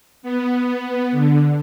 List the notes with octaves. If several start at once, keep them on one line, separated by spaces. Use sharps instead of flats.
B3
D3